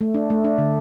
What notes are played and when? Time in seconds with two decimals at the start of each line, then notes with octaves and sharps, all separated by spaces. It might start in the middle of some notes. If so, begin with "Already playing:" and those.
0.01 A3
0.14 D4
0.30 A3
0.44 D4
0.58 D3